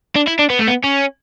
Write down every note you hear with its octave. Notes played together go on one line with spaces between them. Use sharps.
D4
E4
D4
B3
A3
B3
C#4